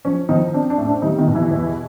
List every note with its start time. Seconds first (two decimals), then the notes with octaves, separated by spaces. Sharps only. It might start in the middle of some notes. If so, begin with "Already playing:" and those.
0.05 F3 C#4
0.29 D#3 F3 D#4
0.54 C4 D4
0.70 D4
0.78 A2
0.87 D4
1.02 D#3 G3 D#4
1.18 D#3 D#4
1.27 B2
1.35 E3 E4
1.51 E2